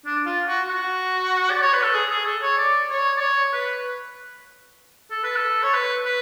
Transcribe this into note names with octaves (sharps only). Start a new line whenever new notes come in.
D4
F4
F#4
F#4
D5
C#5
B4
A4
G#4
G#4
A4
C#5
D5
C#5
D5
C#5
B4
A4
B4
A4
C#5
B4
B4